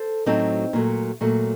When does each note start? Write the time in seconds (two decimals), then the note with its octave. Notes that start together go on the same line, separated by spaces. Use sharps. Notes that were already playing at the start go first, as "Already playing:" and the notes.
Already playing: A4 C5
0.26 A2 F#3 A3 C4 D#4
0.73 A#2 F#3 A3
1.21 A#2 F#3 A3